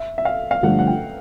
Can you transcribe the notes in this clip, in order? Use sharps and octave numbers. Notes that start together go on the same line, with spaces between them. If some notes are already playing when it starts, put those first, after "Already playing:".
Already playing: E5
E5
F5
F5
G2 D3 F3 A3 F#5
F#5
G5